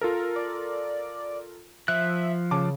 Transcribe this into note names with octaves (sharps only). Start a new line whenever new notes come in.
F4 A4 A#4
D5
F3 E5 F#6
C#3 C#5 A5 D6